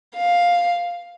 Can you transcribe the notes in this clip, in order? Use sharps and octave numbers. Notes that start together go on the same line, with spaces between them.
F5